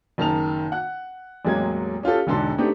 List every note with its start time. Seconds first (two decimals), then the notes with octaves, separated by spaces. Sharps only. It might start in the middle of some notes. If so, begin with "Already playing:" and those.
0.18 F#1 D#3 A5 F7
0.72 F#5 F#6
1.45 A1 E2 F#3 G#3 A#3 G#6
2.03 C#4 F4 G4 A4
2.27 E1 G#2 D3 A4 C6
2.58 A3 B3 C4 D4 D#4 G4